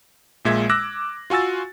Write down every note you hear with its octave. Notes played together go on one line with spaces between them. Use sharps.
A#1 A#2 G#3 E5 G#6
D6 E6 F#6 A#6
F4 F#4 G#5 E6 A6